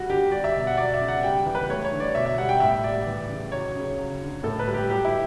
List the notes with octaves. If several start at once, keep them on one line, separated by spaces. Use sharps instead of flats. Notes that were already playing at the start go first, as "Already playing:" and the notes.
Already playing: G3 F#4
D3 G4
G3 D5
E5
B2
F#5
F#3 D5
E5
C#3
F#5
G3 G5
E3
B4
A3 C#5
C#5
D3
D5
B2 E5
E5
G3 F#5
G5
A2 E5
G3 D5
E3
C#3
F#3 C#5
C#3
F#3
D3
A2 A4
B4
G3
G4
F#3 G4
E4